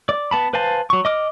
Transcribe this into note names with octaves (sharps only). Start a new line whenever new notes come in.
D5
B3 A5 B5
B4 C5 F5 G#5 A5
F#3 C#6
D#5 D6 F6